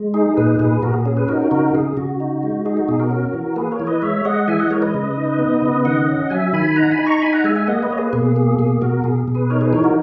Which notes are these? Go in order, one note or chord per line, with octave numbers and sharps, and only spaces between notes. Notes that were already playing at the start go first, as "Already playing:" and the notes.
Already playing: G#3
D#4 G#4
A#2 G#4 B4
A#2 G#4 B4
A#2 F#4 A#4
G#4
C#4 G#4
G#4 B4
D#4 F#4 A#4
C#3 F#4 A#4
C#3 G#4
C#3 F#4
D#4
G#3
D#4 G#4
F#4
B2 G#4
F#4 A#4
C#4
E3
A#3 G#4 B4
A#4 C#5
E3
B4 D#5
G#3 C#5 E5
G#3 D#5 F#5
E3 E5 G#5
D#5 F#5
G#3 A#4 C#5
B4 D#5
C#3
D#4
B3
C#3
D#3 D#5 F#5
C#4
F#3 E5 G#5
D#3 G#5 B5
D#4 F#5 A#5
G#5 B5
D#4
A#5 C#6
D#4 G#5 B5
F#5 A#5
G#3 E5 G#5
E5 G#5
A#3 D#5 F#5
B4 D#5
A#3 C#5
G#4 B4
B2 G#4
A#3 G#4
B2 G#4
B2 F#4 A#4
B2 G#4
B2
G#4 B4
D#4 A#4 C#5
G#4 B4
E3 A#4 C#5
F#4 A#4